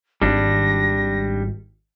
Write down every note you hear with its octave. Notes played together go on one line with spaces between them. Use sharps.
G#1 G3 D4 A#6